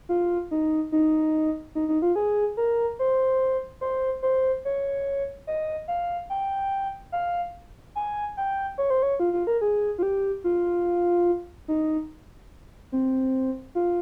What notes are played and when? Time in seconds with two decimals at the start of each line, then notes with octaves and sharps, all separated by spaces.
0.09 F4
0.51 D#4
0.92 D#4
1.75 D#4
1.89 D#4
2.02 F4
2.16 G#4
2.57 A#4
2.99 C5
3.81 C5
4.22 C5
4.65 C#5
5.47 D#5
5.88 F5
6.30 G5
7.12 F5
7.95 G#5
8.37 G5
8.78 C#5
8.90 C5
9.03 C#5
9.20 F4
9.33 F4
9.47 A#4
9.61 G#4
9.98 F4
10.03 G4
10.44 F4
11.68 D#4
12.92 C4
13.75 F4